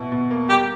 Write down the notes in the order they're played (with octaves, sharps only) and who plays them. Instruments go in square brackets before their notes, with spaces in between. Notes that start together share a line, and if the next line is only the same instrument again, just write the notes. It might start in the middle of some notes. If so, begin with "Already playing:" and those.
Already playing: [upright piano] B2 E4
B2
A#3
[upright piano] G3 [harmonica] G4